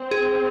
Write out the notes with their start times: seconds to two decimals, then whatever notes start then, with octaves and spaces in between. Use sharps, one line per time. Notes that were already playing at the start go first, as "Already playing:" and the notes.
Already playing: C4
0.11 G#4